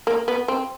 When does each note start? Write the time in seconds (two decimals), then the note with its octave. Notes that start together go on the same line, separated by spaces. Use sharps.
0.07 A#3
0.28 B3
0.48 C4